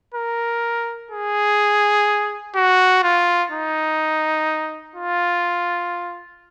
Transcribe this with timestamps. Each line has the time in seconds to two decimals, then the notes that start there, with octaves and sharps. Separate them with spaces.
0.14 A#4
1.11 G#4
2.55 F#4
3.03 F4
3.52 D#4
4.96 F4